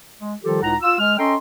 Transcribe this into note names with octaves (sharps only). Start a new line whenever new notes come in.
G#3
D#3 F3 G3 F4 G4 A4
C#2 A2 D#4 F#5 A#5
F4 E6
G#3 F6
C#4 A4 D#5 G5 A#5 C6